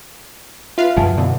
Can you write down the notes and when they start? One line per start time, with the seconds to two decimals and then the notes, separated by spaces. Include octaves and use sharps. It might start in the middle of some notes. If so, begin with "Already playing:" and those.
0.78 F4 B4 E5 F5
0.97 F#2 F3 F#3 F#5 G#5 A5
1.18 B2 D3 E4